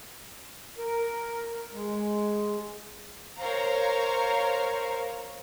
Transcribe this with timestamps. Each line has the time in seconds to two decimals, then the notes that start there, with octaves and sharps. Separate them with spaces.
0.78 A#4
1.73 G#3
3.37 A#4 C5 C#5 F5 A#5